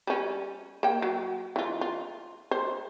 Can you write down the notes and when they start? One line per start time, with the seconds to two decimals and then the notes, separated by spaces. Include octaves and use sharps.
0.07 G3 C#4
0.83 A#3 G5
1.02 F#3
1.56 E3 F4
1.81 F4
2.51 C5